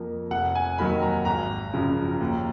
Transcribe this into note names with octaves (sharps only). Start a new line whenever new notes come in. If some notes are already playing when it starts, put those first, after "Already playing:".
Already playing: F2 F3 A#3
F1 F#5
G#5
D#2 D#3 F#3 B5
A#5
G#1 A#5
F#2 C#3 F3
D#2